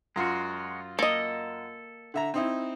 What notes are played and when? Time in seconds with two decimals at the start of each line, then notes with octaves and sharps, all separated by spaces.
0.16 F#2 G#3 F4 F#4
0.99 A#3 A4 D#5
2.14 D3 E5 A#5
2.34 C4 D#4 E4